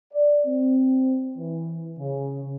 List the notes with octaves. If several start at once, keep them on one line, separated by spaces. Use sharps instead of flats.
D5
C4
E3
C#3